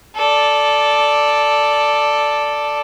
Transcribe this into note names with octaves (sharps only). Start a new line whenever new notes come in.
A4 D5